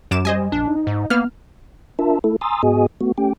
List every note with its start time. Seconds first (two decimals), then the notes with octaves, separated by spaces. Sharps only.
0.11 F#2 D6 E7
0.25 G3 C5 D#5 G#5
0.52 A#1 D4
0.68 D#4
0.87 G#2
1.10 A#3 B3 F6
1.99 D4 F4 A#4 E5 A5
2.24 A3 E4 A4
2.41 G#5 A#5 C6 D#6 E6 A6
2.63 G#2 B3 F#4 G#4 D#5 G#5
3.01 A3 B3 F#4
3.18 A3 C#4 G4 G5